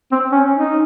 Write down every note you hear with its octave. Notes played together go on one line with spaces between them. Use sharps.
C4
C#4
D#4